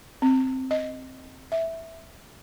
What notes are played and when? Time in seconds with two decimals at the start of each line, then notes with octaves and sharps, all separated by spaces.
0.22 C4
0.71 D#5
1.52 E5